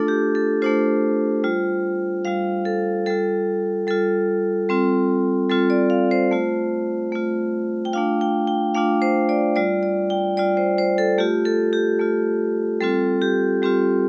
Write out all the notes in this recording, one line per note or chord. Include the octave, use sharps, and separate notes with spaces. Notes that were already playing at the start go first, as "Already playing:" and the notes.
Already playing: A3 D4 F4 A4
G4
A4
A3 D4 F4 C5
G3 F4
G3 F4 F5
A4
G3 F4 A4
G3 F4 A4
G3 C4 F4
G3 C4 F4 A4
D5
F5
C5
A3 F4
A3 F4
G5
A3 D4 F4 F5
G5
G5
A3 D4 F4 F5
C5
D5
G3 F4 D5
D5
G5
G3 F4 D5
C5
C5
A4
A3 F4 G4
A4
G4
A3 F4
G3 C4 F4 A4
G4
G3 C4 F4 G4